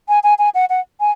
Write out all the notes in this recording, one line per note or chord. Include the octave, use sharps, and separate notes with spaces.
G#5
G#5
G#5
F#5
F#5
G#5